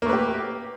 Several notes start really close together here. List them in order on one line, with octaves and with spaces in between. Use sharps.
A#3 A3 B4 G4